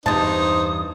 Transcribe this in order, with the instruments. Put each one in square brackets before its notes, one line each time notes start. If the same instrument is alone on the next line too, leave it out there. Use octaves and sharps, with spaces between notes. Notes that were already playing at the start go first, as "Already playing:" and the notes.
[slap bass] E2 G2 [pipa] C3 A5 [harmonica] D#4 C5 [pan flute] D#6